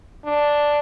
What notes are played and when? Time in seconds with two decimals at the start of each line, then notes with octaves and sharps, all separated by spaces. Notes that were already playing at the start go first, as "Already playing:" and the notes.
0.25 D4